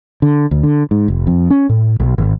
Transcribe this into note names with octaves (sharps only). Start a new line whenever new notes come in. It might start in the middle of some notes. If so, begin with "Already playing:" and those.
D3
D2
D3
G#2
F1
F2
C#4
A2
B1
G#1